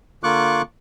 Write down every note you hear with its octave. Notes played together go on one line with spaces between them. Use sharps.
D3 A#3 F4 C#6 D6 F#6